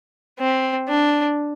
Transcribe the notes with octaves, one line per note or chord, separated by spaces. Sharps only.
C4
D4